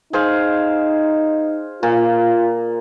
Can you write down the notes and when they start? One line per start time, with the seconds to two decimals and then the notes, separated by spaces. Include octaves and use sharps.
0.13 D#4 G#4 C5 F5
1.83 A#2 F4